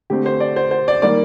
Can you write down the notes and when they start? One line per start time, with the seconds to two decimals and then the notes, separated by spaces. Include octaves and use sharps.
0.10 D3 A3 C4 G4
0.26 C5
0.40 D5
0.56 C5
0.71 C5
0.88 D5
1.02 D#3 G3 A#3 D5